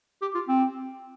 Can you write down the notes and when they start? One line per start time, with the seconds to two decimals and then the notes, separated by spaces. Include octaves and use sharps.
0.22 G4
0.35 F4
0.48 C4